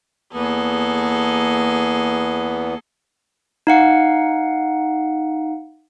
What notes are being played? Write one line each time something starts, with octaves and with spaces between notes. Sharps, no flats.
E2 E3 A#3 B3 G#4 A4
D#4 F5 F#5